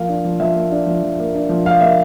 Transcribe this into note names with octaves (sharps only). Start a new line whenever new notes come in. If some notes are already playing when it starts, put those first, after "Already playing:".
Already playing: F3 A#3 F5
D4
F3
F3 E5
A#3
D4
F3
F3
A#3
D4
F3
F3 F5
A#3 E5